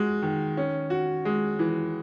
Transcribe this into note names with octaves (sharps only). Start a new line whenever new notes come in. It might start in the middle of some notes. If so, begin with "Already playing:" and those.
Already playing: G#3 F#4
D#3
C#4
F#4
G#3
E3